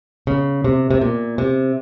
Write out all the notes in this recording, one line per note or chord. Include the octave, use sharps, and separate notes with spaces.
C#3
C3
C3
A#2
C3